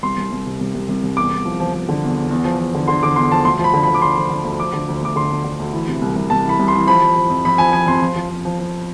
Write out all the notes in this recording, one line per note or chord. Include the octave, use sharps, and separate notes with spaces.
C2 C6
C2
C2
C3
C2
C2
C2
C2
E2 D6
E2
F3
F3
F3
D3
E2
E2
E2
F3
F3
D3
D3 C6
D3 D6
E2 C6
F3 A5
D2 C6
F3
B5
D3
B5
D3
D6
D3 C6
F3
D3
D2
F3 D6
D3
D2
D2 D6
D3 C6
D2
D3
D2
E3
C3
C2
C2
C2 A5
E3 B5
C2
C6
E3
F3 B5
F3
F3
F2
F2 B5
F3 G#5
F3 G#5
F2 C6
F3
F3
F3
F3
F3